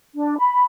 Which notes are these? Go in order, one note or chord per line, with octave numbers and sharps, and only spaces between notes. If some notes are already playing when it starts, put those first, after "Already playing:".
D4
B5